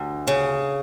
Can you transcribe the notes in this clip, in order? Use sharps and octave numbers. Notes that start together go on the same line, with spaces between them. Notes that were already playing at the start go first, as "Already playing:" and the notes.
Already playing: D2
C#3